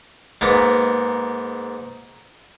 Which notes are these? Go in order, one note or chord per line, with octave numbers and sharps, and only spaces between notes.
G#2 A#3 B3